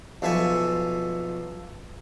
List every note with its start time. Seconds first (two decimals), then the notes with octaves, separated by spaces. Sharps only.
0.22 B1 F3 A4 E5 G#5 C#6